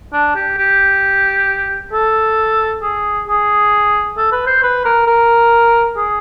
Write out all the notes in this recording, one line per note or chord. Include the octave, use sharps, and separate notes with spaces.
D4
G4
G4
A4
G#4
G#4
A4
B4
C5
B4
A#4
A#4
G#4